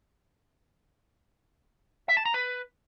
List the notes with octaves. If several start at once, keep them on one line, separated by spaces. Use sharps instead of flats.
E5
A5
A#5
B4